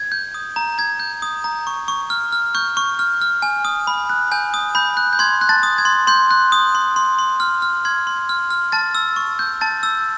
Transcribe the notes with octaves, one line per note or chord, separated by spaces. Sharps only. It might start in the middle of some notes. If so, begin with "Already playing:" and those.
Already playing: G#6
G6
D#6
A#5
A#5 G#6
G6
D#6
A#5
C#6
C#6
F6
F6
C#6 G6
C#6
F6
F6
G#5
D#6
B5
F#6
G#5 G6
D#6
B5 G6
F#6
G6
C6 G#6
F#6
A5 A6
D#6
G#6
C6
C6 G6
F#6
D#6
C6
C6
C6
F6
F6
C6 G#6
C6
F6
F6
A5 A6
E6
C#6
G6
A5 A6
E6